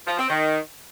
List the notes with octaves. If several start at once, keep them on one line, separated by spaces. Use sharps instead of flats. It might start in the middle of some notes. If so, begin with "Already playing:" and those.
F3
C4
D#3